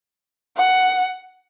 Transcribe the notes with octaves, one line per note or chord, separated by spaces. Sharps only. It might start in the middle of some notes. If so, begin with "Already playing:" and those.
F#5